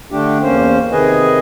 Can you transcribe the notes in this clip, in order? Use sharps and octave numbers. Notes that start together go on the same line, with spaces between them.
D3 A3 D4 G4
E2 A#3 C#4 C5
C3 D#3 G#4 B4 D#5 G#5